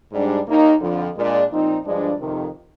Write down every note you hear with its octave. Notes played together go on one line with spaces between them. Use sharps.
G#2 G3 D4
D#2 D#3 A#3 D#4
F2 D3 F3
A#2 G#3 D4
A#2 F3 C4 D#4
G2 F3 G#3 D4
F2 C3 D#3